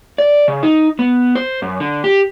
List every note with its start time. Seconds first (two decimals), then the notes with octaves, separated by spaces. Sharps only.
0.18 D5
0.48 C#3
0.63 D#4
0.99 B3
1.35 C5
1.62 F#2
1.80 D3
2.04 G4